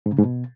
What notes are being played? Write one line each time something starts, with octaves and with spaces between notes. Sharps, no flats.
G#2
C#3
G#2
B2